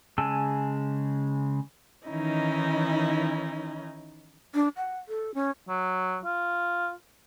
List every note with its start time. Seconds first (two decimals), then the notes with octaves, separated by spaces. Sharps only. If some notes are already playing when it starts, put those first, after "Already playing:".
0.18 C#3 G#3 G#5 A5 E6
2.08 D#3 E3 C#4 D#4 E4
4.54 D4
4.77 F#5
5.08 A4
5.34 C#4
5.68 F#3
6.25 F4